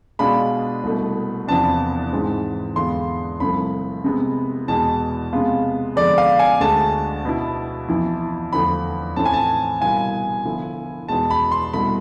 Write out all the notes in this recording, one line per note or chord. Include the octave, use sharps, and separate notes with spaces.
B2 G#3 D4 F4 B5
C2 B2 A3
E2 C3 F3 B3 D4 A5
G#2 E3 G#3 C4
E2 D3 G#3 B3 F4 C6
C2 C3 F3 A3 B5
C3 G#3 B3
E2 B2 G#3 A5
C3 G#3 B3 F4
F2 D3 G#3 B3 D5
F5
G#5
D2 D3 G#3 A5
B2 B3 E4
F2 E3 B3 E4
E2 D3 F3 A3 B5
A2 E3 A3 C4 E4 A5
G#5
A5
C2 B2 B3 F4 G#5
D3 F3 B3 E4
E2 B2 G#3 A5
B5
C6
C2 B2 A3 B5